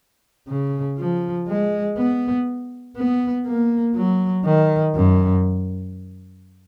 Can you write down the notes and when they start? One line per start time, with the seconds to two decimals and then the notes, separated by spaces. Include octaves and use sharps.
0.48 C#3
0.98 F3
1.48 G#3
1.97 B3
2.97 B3
3.47 A#3
3.96 F#3
4.45 D#3
4.95 F#2